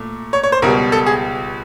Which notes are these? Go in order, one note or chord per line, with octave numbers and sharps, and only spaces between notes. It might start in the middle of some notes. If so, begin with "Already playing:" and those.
Already playing: A#2 A3
C#5
C#5
C5
C#2 B2 G3 A#4
A4
G#4